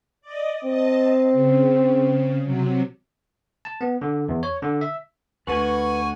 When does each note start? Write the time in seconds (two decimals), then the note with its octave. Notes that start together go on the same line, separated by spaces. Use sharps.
0.21 D5 D#5
0.63 C4 D#5 A5
1.32 C#3
2.44 C3 F#3
3.65 A5
3.81 B3
4.01 D3
4.29 E2
4.43 C#5
4.62 D3
4.81 E5
5.47 D2 B4 F#5 G#5 C#6